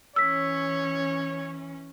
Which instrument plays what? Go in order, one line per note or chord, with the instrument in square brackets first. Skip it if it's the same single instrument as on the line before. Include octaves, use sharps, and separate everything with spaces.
[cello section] E3 C#4 [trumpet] C#5 [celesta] E6 B6